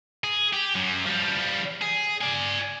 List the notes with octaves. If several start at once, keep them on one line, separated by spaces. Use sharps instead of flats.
G#4
G4
F#2 F#3
F3 G3
G#4
D5 G#5